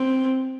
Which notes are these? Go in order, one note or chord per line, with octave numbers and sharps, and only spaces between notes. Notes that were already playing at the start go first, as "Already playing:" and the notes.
Already playing: C4